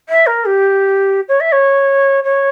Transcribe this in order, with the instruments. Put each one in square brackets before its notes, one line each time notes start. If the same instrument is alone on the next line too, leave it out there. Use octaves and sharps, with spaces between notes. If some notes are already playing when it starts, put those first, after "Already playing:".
[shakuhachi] E5
A#4
G4
C#5
E5
C#5
C#5